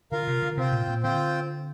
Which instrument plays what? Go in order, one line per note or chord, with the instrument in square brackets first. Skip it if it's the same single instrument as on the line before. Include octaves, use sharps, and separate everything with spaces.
[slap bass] D3 [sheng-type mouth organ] F4 A#4 F5
[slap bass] C3
D3
[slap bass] C3 [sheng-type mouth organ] C4 F4 C5 G5
[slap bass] A#2
A#2
[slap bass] D3 [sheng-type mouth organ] C4 F4 C5 G5